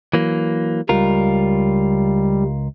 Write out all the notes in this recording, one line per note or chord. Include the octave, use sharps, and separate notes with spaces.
E3 F#3 A#3
C#2 G3 F4 A#4